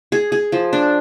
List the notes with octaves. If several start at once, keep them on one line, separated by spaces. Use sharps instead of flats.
G#4
G#4
F3
D4